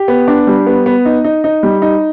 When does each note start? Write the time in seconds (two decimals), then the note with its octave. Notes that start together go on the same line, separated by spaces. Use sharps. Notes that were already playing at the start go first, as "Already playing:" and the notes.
Already playing: G4
0.08 B3
0.28 D4
0.47 G3
0.67 B3
0.86 B3
1.05 D#4
1.24 D#4
1.44 D#4
1.63 G3
1.82 D#4